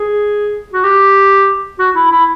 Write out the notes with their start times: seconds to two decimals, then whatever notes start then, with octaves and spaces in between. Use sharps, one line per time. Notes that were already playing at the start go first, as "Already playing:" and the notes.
Already playing: G#4
0.73 F#4
0.84 G4
1.79 F#4
1.95 E4
2.11 E4